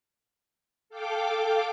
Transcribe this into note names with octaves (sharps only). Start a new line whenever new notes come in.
A4 F5 G5 D6